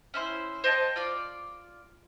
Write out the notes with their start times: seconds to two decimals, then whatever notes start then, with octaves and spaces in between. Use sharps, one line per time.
0.14 C#4 E4 C5
0.64 C5 D#5 G5 A5
0.96 F4 D5